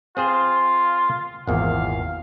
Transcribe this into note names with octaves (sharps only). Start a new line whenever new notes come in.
C4 F4 G#4 C5
G#1 E2 A#2 F5